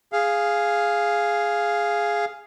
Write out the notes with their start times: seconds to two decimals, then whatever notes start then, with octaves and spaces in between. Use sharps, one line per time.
0.13 G#4 F5